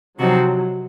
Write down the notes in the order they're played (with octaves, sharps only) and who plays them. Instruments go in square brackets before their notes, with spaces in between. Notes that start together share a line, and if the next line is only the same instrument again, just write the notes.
[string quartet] C3 F3 C4 D#4 F#4 [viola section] F#3